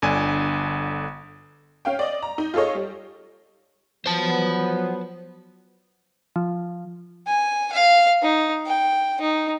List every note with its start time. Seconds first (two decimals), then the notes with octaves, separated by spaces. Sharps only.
0.02 G1 D3 D4 G#5
1.85 C#4 F5 G5
1.99 D5 D#5
2.22 A#5
2.38 D#4
2.54 F4 G#4 A4 C#5 D#5
2.75 G3
4.06 F3 F#3 B3 C5 A5
6.36 F3
7.27 G#5
7.73 F5
8.23 D#4
8.66 G5
9.21 D#4